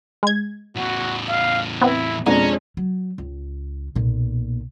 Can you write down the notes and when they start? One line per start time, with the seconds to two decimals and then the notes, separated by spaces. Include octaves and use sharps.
0.23 G#3 G#6
0.76 E2 A2 F#4
1.29 F5
1.81 B3 C4 E4
2.26 F2 B2 G#3 C#4 D4 A#5
2.77 F#3
3.18 C#2
3.95 B1 A#2